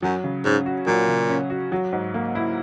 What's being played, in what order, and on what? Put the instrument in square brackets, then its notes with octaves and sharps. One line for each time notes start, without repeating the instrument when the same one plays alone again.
[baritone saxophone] F#2 [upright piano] F#3
[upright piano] C#3
[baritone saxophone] G#2 [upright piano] C#4
[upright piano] F#4
[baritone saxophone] A#2 [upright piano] F#3
[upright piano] C#3
C#4
F#4
F#3
G#2
A#3
E4